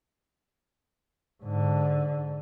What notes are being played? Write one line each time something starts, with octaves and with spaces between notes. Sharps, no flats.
G#2 D3